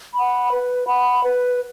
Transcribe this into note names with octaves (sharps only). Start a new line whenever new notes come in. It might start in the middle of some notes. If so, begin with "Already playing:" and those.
F#5 B5
B4
F#5 B5
B4